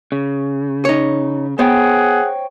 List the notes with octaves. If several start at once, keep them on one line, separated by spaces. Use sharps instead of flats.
C#3
D#4 C#5
B3 G#4 C5 C#5 F#5 G5